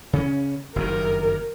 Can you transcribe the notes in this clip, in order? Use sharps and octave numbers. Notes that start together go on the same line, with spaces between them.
C#3 C#4
F#1 G2 D#3 A#4